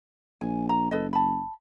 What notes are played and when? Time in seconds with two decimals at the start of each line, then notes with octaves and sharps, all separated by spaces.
0.41 A#1 G#5
0.69 A#5
0.91 F#1 A4 B4 D#5
1.13 A5 B5